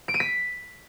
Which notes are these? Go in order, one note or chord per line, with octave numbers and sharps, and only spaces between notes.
D7
D#7
B6